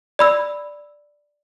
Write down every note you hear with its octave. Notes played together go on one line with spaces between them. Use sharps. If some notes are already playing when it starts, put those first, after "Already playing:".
D5 B5 E6